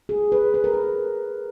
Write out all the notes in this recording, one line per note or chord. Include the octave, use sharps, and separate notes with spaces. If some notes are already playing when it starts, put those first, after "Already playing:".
G#4
B4
B4
A#4
B4